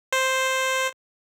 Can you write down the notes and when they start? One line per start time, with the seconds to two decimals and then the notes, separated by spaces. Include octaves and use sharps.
0.13 C5